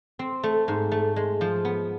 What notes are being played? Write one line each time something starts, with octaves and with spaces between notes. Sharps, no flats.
C4
A3
G#2
A3
G#3
F3
B3